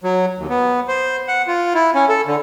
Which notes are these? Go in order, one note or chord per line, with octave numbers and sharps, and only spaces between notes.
F#3
D#2
B3
C5
F#5
F4
E4
C#4
A4
D3